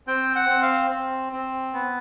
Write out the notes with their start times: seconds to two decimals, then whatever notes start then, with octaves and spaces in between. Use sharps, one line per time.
0.07 C4 G5
0.36 F#5
0.49 C4
0.63 F5
0.91 C4
1.32 C4
1.74 B3